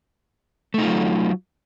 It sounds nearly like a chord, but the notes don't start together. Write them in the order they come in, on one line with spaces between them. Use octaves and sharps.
A3 D#4 F4 F#3